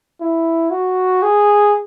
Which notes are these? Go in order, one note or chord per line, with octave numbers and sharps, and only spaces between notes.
E4
F#4
G#4